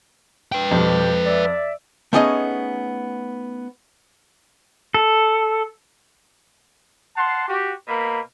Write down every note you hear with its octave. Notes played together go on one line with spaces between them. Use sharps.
B4 G5
F2 B2 G3 G4
D5 E5
A3 B3 C#4 D#4 G#4 D#5
A4
F5 F#5 A5 C6
F#4 G4
B2 A#3 A#4 B5